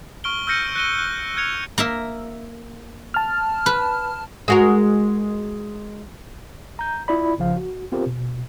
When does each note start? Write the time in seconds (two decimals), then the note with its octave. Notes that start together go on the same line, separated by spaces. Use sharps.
0.24 C#6 F6 D7 G7
0.47 E6 F6 G6 A#6 C#7 D#7
0.75 F#6 A#6 D#7 G7
0.98 F#6
1.36 F6 F#6 G#6 C#7 F7
1.78 A#3 A#4 E5
3.14 A5 F6
3.66 B4
4.48 G#3 F#4 A#4
6.79 A#5 G6
7.08 E4 F4 D5 B5
7.38 A#1 C#3 F3 F5
7.56 F#4
7.92 B3 C4 F4 G4 A#4 C5
8.07 B2